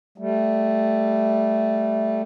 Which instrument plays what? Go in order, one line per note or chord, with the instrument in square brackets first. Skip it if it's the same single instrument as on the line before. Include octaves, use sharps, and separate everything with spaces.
[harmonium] G3 A3